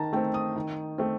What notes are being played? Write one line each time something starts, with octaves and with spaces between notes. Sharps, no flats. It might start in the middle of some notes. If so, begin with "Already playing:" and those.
Already playing: D#3 A5 A#5
A3 C4 G5
D#6
D#3
A3 C4